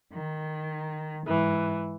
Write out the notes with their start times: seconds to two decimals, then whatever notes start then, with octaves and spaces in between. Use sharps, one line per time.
0.13 D#3
1.27 G#2 E3